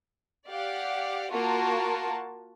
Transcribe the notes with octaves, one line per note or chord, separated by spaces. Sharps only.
G4 D5 F5 F#5
A#3 F4 F#4 A#4 A5